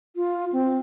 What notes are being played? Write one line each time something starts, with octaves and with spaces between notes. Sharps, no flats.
F4
C4